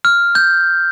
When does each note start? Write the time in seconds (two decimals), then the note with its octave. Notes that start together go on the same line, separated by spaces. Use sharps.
0.05 F6
0.35 G6